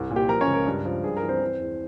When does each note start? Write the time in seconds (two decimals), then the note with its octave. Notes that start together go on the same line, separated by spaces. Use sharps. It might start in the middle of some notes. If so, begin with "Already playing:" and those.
Already playing: C2
0.10 A#2
0.16 G4 G5
0.28 F3 A#4 A#5
0.41 C#4 C#5
0.47 C#2
0.53 A#4
0.66 G2
0.85 F3
1.04 G2 G#4
1.17 A#4
1.23 E3
1.29 C4 C5
1.41 E3
1.60 E2